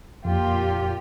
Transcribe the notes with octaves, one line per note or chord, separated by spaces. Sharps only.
F2 A#2 F4 G4